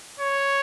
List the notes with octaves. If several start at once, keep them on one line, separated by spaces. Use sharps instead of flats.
C#5